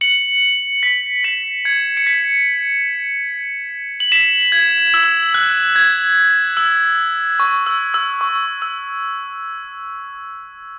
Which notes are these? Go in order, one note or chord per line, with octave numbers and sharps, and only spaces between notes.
C#7 F#7
B6
B6 E7
G#6 C#7
C#7
B6
F#7
B6 E7
G#6
E6
F#6
G#6
E6
C#6
E6
E6
C#6
E6